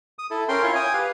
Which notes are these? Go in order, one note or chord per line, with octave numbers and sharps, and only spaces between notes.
D#6
E4 A4
C#4 A#4 G5 C6
E4 F4 C#5
G5 G#5 D#6
G4 B4 F5